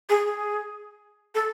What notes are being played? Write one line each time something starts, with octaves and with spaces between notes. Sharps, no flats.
G#4
G#4
A4